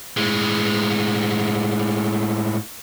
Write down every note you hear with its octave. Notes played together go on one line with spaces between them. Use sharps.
A2 G#3